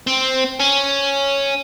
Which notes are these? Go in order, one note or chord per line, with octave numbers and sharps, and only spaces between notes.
C4
C#4